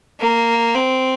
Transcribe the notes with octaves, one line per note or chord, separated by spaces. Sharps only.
A#3
C4